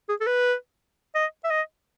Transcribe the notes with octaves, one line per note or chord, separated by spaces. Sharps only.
G#4
A4
B4
D#5
E5
D#5